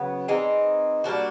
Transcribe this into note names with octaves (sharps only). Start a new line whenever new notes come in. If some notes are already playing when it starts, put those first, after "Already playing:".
Already playing: C#3 F#3 B3
E3 G#3 C4 D#4
G3 A#3 D4 F#4